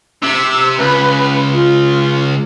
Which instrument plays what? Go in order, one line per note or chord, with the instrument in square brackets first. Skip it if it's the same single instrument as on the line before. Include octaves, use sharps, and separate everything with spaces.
[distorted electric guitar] C3 [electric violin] E6
[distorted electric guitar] C#2 [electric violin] B4
[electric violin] F4